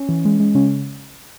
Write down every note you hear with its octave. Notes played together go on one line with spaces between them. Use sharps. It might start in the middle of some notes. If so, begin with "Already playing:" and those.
Already playing: C#4
E3
G#3
G#3
C#3 C#4